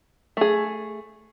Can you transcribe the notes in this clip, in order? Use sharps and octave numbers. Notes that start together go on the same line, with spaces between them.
A3 G#4